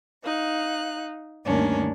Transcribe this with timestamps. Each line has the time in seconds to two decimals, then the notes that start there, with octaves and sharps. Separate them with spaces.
0.23 D#4 F5 F#6
1.45 D2 G2 D#3 A#3 C#4 D4